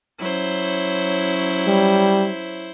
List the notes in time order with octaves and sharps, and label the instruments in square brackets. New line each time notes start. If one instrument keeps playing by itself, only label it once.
[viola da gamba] F#3 C#4 [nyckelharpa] E4 C5
[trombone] G3